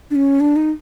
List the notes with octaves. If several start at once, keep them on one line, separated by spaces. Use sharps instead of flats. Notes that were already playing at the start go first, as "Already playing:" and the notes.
D4
C#4
D4
D#4